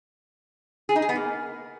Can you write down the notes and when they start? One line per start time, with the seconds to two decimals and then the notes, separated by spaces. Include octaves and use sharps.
0.89 G#4
0.96 D#4
1.02 G#4
1.09 B3
1.15 A#3